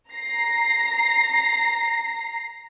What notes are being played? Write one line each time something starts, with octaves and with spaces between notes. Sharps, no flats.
A#5 A#6 C7